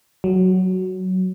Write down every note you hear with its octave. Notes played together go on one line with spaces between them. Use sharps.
F#3